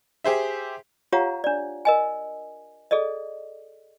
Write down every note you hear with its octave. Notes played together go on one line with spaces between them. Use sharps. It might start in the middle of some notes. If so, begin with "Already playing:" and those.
G4 G#4 C5 E5
F4 G4 C#5 F5 F#5 A#5
D4 D5
A#4 D#5 G#5
G#4 A4 D5 D#5